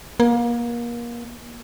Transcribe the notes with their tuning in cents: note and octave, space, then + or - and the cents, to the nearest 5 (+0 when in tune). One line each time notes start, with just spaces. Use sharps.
A#3 +30